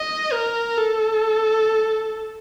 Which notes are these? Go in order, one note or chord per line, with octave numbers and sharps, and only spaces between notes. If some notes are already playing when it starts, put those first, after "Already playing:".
Already playing: D#5
A#4
A4